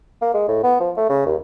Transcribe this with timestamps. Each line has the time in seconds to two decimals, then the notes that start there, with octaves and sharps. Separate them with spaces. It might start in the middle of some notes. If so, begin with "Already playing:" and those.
0.21 A#3
0.34 G#3
0.48 A2
0.63 B3
0.80 F3
0.97 A3
1.09 C#3
1.26 D#2